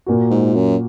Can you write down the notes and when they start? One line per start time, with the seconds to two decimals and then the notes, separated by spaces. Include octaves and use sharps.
0.06 A#2 A#3 F#4
0.31 G#2
0.55 F#2